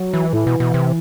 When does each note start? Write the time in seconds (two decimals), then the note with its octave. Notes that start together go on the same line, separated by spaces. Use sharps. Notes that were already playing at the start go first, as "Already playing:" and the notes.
Already playing: F#3
0.13 E3
0.33 A2 E3
0.47 B2
0.60 B2
0.74 C3